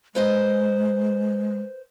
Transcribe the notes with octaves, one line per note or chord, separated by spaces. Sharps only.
G#3 B4 C5 D#5